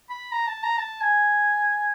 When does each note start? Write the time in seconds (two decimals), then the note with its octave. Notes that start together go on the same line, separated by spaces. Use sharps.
0.09 B5
0.32 A#5
0.47 A5
0.63 A#5
0.78 A5
1.01 G#5